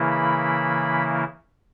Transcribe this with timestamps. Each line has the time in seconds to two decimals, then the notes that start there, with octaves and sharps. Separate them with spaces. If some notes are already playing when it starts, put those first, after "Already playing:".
Already playing: C#3 E3 A#3 E4
0.11 B5